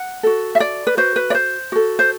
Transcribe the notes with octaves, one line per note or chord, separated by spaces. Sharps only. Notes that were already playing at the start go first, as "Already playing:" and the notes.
Already playing: F#5
F#4 A4
E5
D5
B4
F#4 B4 C5
B4
D5
C5
F#4 A4
C5